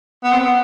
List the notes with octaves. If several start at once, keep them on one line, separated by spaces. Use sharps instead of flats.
B3
C4
B3